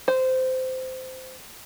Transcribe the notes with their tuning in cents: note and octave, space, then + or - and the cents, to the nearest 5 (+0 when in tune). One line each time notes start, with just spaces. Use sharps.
C5 -15